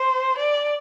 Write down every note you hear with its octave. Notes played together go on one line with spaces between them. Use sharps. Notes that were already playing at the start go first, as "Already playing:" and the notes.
Already playing: C5
D5